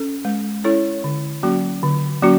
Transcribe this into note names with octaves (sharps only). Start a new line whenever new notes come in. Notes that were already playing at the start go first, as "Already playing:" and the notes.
Already playing: C#4 A4
G#3
C#4 E4 A4 C#5
D3
F#3 A#3 C#4 F#4
D3
F#3 A#3 C#4 F#4